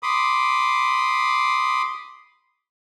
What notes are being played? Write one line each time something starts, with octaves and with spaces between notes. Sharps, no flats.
B5 C6 D6 D#6